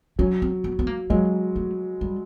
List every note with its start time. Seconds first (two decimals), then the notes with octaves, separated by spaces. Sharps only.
0.19 F#3 C#4
0.42 C4
0.64 B3
0.79 B3
0.87 A#3
1.10 F#3 G#3 A#3
1.56 A3
2.01 G3